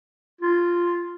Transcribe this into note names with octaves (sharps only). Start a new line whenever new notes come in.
F4